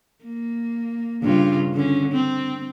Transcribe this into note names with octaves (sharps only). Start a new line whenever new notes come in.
A#3
G2 C#3 F4
D3 C#4
C4